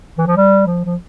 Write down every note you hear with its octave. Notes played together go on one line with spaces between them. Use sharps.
E3
F3
G3
F3
F3